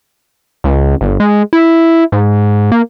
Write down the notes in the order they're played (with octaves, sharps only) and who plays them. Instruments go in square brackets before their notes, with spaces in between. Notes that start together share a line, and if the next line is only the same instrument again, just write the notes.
[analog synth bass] C#2
G1
G#3
E4
G#2
A#3